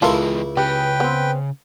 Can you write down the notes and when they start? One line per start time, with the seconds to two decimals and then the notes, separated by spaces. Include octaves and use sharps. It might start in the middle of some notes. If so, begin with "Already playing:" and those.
0.02 C#2 E3 G#3 E4 F4 A4 A#4
0.57 C#3 G4 B4 G5
1.00 B3 C4